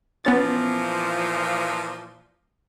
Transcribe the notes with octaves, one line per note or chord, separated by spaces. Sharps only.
A#2 E3 F3 B3 C#4 A6